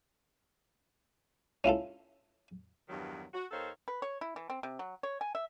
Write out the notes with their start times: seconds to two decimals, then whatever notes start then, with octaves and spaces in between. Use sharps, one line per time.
1.64 C#4 E4 F4 A4
2.89 E2 G2 D#3 F#3
3.33 F#4
3.51 D#2 D#3 A4 C5 C#5 F5
3.88 B4
4.02 C#5
4.21 E4
4.36 E3
4.50 C4
4.63 C3
4.79 F#3
5.03 C#5
5.21 G#5
5.35 E5